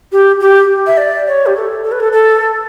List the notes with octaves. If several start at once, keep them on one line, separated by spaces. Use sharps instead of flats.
G4
G4
E5
D5
C#5
G4
A4
A4
B4
A4
A4